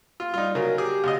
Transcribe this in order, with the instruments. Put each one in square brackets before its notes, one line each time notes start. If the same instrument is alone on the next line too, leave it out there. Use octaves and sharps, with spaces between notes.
[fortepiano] F4
[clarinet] G3 [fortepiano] D#4 F4
[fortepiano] C#3 F#3 [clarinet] A#4
[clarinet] G4 [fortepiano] G#4
[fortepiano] D2 C#3 D#5